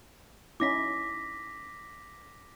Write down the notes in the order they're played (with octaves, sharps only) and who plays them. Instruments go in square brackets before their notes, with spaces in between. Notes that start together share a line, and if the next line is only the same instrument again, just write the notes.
[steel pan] C#4 D#4 E4 [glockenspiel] D6 A#6 B6